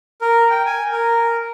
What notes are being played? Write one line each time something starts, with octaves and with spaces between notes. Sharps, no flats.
A#4
G5
G#5
A#4